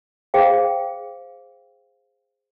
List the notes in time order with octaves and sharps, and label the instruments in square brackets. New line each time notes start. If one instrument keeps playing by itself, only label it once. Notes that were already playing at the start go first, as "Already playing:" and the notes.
[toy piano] G#4 C5 F5 G5